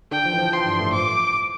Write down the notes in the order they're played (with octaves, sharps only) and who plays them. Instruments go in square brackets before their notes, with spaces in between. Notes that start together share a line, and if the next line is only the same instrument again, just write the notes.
[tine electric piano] D3 D4 [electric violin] G5
[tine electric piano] F3
E3
F3
[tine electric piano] F3 [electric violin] C6
[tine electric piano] G2 G3
A2 A3
[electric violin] D6